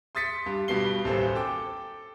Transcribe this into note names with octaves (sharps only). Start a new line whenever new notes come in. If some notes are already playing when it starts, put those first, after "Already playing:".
C6 D#6 A6 B6 C#7
G2
G2 B2 G3 C7 G7
A1 D#2 G3 A4 C5
A4 G5 D6